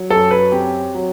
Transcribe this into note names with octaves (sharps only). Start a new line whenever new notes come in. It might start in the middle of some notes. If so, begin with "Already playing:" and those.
Already playing: F#3
F#2 A4
B4
C4 G4
F#3